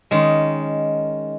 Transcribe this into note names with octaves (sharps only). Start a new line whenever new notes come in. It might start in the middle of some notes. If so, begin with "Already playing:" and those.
D#3 G#3 C#4